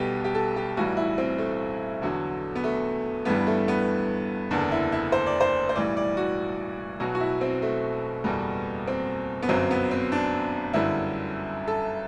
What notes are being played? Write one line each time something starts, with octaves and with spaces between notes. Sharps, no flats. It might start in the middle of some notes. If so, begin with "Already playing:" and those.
Already playing: B1 B2 G3 B3 G4 A4
G4
A4
G4
B1 A2 E3 G3 F#4
E4
C4
A3
E2 D3 F#3
B3
A3
G1 G2 E3 G3 B3
A3
B3
F#1 E2 D3 D4
E4
E4
C5
D5
C5
C5
B1 A2 E3 G3 D5
D5
F#4
B1 B2 F#3 F#4
F#4
E4
C4
A3
F#1 E2 B2 G3
C4
B3
G1 F#2 F#3 C4
B3
C4
D4
G1 F#2 D3 G3 E4
A4